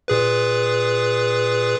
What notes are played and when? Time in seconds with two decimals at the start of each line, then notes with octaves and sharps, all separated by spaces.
0.08 A#2 G#4 B4